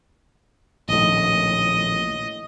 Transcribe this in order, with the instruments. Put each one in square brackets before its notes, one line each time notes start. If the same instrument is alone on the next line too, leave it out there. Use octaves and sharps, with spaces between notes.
[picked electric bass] A#1 D#2 A2 [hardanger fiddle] D#5